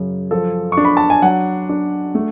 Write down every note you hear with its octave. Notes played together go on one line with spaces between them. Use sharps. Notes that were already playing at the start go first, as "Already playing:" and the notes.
Already playing: F#2 C#3
F3 A4
C#6
D4
B5
A5
G#5
F#3 F#5
D4
A3